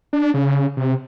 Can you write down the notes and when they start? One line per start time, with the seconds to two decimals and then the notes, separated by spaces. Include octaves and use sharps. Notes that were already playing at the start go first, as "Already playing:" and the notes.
0.13 D4
0.34 C#3
0.77 C3